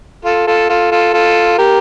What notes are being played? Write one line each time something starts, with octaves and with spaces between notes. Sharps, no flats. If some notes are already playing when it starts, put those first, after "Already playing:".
F4 A4
F4 A4
F4 A4
F4 A4
F4 A4
G4 A#4